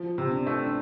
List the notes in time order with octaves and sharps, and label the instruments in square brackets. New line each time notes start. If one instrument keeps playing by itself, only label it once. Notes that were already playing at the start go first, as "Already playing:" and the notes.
Already playing: [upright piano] F3
C3
[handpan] C4 D4
[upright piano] A3
[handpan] D4